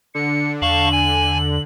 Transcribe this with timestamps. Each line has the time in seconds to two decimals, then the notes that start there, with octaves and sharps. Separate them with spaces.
0.15 D3 C#7
0.62 E2 F5 A5 C#6 F#7
0.92 G#5